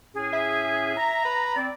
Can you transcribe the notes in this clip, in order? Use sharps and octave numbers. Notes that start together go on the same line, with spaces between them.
A2 C#4 G#4
E5
A#5
B4
C4 D5